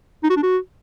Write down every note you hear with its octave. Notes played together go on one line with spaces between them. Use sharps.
D#4
F#4
D4
F#4